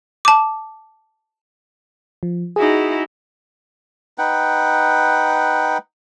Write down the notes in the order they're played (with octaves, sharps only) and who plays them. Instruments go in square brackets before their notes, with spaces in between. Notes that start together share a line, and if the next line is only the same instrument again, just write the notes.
[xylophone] A5 D6
[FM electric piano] F3
[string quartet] D#4 E4 F#4 [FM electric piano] G#4
[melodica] D#4 B4 F#5 G5